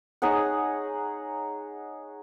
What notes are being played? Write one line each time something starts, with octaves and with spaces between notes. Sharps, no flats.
D#4 G#4 C#5 F#5